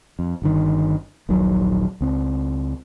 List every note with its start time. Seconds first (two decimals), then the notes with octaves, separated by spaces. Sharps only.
0.19 F2
0.42 G1 G2 D#3
1.29 D#1 A#1 D#3 F#3
2.01 C#2 C4